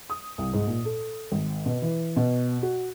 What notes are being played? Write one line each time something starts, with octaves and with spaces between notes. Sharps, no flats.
D#6
C2
G#2
A#2
A4
G#1
B2
E3
B2
F#4